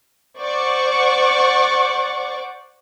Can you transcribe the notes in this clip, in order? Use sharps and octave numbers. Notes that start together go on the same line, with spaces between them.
C5 D5 F#5 C#6 D6